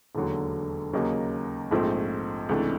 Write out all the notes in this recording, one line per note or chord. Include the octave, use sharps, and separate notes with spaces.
E1 D#2 D3 F#3
D#2 C#3 F#3 A#3 D#4
A#1 G#2 F3 A3 C4
C#2 C3 E3 A3 D4